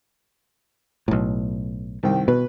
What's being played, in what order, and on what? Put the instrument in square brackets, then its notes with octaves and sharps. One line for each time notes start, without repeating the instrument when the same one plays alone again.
[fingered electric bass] B1 A2
[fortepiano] C2 D#3 G5
[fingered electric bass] B2 [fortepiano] B4